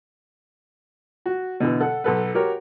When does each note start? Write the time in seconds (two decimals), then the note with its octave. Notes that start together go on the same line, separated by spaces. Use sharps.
1.26 F#4
1.60 B2 D3 E3
1.80 A4 F#5
2.04 B1 A4 B4
2.34 F#4 G4 A#4 C#5